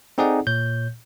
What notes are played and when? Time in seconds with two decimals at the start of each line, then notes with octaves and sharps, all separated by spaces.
0.18 C4 D#4 G#4 A4 D5 F#5
0.47 A#2 C#5 G6